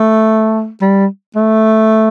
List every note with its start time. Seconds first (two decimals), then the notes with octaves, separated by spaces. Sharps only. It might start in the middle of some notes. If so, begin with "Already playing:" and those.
Already playing: A3
0.81 G3
1.36 A3